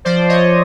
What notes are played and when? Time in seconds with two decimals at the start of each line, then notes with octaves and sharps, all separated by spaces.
0.05 F3 C5 D5
0.29 C#5 D#5